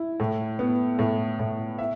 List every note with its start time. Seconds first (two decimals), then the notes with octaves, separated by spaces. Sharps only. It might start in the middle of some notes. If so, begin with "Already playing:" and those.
Already playing: E4
0.20 A2
0.59 B3
0.99 A2
1.39 A2
1.78 E5